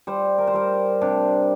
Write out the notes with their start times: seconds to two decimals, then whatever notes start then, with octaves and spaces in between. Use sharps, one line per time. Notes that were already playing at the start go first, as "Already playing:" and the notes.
0.07 G3 C5
0.38 A#4
0.47 C5
0.54 G3 A#4
1.01 C3 D4